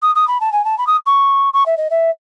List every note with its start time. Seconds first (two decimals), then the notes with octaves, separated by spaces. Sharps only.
0.02 D#6
0.15 D#6
0.27 B5
0.40 A5
0.52 G#5
0.64 A5
0.78 B5
0.87 D#6
1.06 C#6
1.53 C#6
1.66 E5
1.77 D#5
1.90 E5